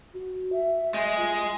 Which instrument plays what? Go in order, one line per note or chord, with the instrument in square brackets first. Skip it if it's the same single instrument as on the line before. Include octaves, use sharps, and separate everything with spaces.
[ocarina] F#4
E5
[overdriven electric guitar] G#3
[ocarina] F4